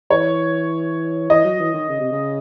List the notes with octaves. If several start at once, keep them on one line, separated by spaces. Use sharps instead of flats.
E3 C#5
E3 D#5
F#3
E3
D#3
C#3
C3
C#3